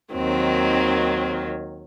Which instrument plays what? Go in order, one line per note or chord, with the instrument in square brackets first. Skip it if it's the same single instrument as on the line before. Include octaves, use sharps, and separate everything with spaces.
[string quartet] D#2 D#3 F#3 C4